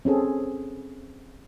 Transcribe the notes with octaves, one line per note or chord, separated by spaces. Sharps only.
C4 C#4 G#4 A4